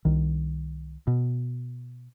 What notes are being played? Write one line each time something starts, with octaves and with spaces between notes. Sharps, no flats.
C2 D#3
B2